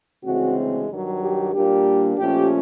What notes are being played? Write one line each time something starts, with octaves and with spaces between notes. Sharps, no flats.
D2 C#3 E3 G#3 C4 F#4
G2 D#3 F#3
G4
A#2 G3 A#3 D4 G4
A#2 F3 A3 C#4 G4